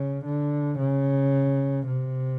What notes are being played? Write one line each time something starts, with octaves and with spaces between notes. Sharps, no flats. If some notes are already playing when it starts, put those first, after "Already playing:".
Already playing: C#3
D3
C#3
C3